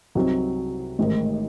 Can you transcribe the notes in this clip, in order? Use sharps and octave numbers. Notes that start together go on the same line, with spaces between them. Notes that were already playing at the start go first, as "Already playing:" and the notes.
C2 C3 F#3 C4 D#4
A1 G#2 D#3